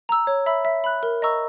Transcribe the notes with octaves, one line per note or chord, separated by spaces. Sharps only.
A#5 E6
C#5
E5 B5 E6
E5
B5 F#6
A#4
D#5 A#5 C#6 E6